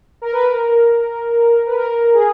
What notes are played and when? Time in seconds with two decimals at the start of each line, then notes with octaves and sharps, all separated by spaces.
0.22 A#4
0.33 B4
0.45 A#4
1.66 B4
1.76 A#4
2.14 G#4